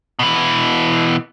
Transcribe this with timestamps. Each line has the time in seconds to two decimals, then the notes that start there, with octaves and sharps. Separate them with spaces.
0.19 B2 E3